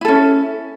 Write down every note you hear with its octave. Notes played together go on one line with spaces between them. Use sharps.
C#4 E4 A4